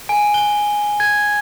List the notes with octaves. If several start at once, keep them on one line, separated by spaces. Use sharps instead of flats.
G#5
G7
G#6